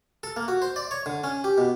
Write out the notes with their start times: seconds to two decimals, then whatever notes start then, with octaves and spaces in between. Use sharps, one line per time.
0.23 A4
0.36 A#3
0.48 F#4
0.62 C5
0.76 D5
0.91 C#5
1.06 D3
1.24 C#4
1.44 G4
1.58 B2